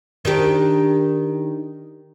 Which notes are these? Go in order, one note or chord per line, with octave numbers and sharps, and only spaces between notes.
D#3 D4 G4